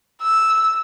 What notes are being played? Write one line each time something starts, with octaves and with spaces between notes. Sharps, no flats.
E6